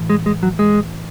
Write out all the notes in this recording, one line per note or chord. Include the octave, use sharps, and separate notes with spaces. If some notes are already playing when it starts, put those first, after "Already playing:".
Already playing: A2 E3
G#3
G#3
F#3
G#3